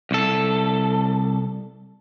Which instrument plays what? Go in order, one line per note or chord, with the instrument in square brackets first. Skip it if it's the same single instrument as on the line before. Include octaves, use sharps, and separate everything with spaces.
[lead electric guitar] C2 A4